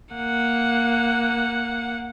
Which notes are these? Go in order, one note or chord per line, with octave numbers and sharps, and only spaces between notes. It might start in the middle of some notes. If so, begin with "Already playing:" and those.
A#3 F#5